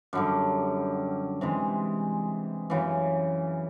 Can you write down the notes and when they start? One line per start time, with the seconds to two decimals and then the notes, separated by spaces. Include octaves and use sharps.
0.13 F#2 D3 G3
1.41 C3 E3 G#3
2.70 F#2 C#3 E3